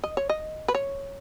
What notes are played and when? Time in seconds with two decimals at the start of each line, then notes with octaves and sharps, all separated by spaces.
0.04 D#5
0.17 C#5
0.29 D#5
0.68 B4
0.75 C#5